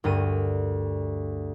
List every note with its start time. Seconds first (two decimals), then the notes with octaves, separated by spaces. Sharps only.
0.04 D2 G2 A#4 D#7